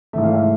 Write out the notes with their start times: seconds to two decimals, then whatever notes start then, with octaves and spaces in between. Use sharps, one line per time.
0.13 G#2 E3 A3 E5
0.24 F5
0.34 E5